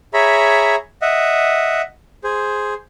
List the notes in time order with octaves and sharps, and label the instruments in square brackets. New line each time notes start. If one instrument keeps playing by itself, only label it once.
[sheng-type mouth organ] G#4 C#5 E5 A#5 B5
D#5 E5 F#5
G#4 C5